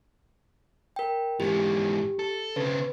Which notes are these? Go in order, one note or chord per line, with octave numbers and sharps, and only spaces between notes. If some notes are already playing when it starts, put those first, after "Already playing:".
A#4 G5
G#2 E3 G4
A4
C#3 C4 B4